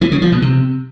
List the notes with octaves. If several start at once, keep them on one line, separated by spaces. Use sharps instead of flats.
E3
C#3
F3
B2
C3